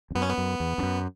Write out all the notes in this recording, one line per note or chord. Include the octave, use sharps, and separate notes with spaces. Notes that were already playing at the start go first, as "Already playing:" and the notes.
E2
F#2 B3
C#4
B3
F#2
E2
E2
F#2